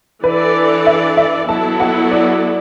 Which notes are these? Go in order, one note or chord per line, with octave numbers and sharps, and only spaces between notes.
E3 D4 A4 B4 D5
E5
E5
F#3 B3 E4 A4 A5
F#5
D5